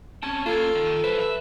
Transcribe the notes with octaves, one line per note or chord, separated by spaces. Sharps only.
C4 C#4 A5
A#3 C#4 F4 A4
D#3
E4 B4 C5
F3 E5